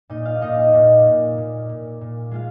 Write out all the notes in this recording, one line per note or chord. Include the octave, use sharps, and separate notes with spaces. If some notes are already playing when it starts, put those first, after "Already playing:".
A#2 D#4 D#5
F4 F5
A#2 D#4 D#5
A#2
A#2
A#2
A#2
A#2
G#3 F4 F5